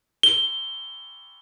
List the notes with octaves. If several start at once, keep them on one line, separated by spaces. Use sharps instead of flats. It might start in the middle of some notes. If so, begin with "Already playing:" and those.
G7